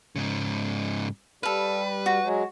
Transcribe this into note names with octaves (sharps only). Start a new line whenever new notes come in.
G#2 C#3
G3 A4 B4 F5
F#4
F#3 G#3